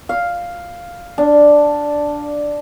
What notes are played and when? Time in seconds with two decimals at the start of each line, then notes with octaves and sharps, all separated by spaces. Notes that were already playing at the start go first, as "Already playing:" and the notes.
0.09 F5
1.18 D4